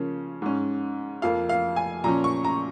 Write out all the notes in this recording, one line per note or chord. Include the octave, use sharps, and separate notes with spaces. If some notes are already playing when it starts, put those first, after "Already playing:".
Already playing: C#3 F3 A#3 C#4
G#2 G#3 C#4
F2 F3 A#3 F5
F5
G#5
A#2 F3 C#4 A#5
C#6
A#5